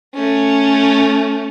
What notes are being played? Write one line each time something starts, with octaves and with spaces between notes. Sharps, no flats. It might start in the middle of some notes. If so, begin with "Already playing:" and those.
A3 C#4